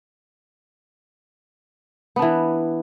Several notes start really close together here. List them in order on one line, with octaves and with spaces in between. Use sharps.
B3 D4 E3